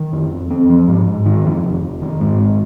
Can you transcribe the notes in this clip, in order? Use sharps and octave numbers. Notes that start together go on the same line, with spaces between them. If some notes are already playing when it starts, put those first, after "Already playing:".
Already playing: D#3
F2
F2
C4
F3
G#2
G#2
D#3
F2
F1
F1
D#3
G#2
G#1